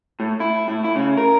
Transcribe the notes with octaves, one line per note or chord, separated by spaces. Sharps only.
A2
E4
A2
E4
C#3
A#4